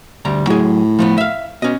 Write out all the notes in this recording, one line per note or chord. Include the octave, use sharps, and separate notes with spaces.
D2 G3 A#5
A2 F#3 G#4
F3 A3 B3
E5 F5
B2 C#4 D#5